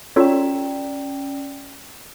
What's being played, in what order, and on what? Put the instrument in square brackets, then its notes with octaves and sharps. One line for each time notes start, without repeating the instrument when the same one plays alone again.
[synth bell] C#4 D5 G5 [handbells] F4 A4 C#5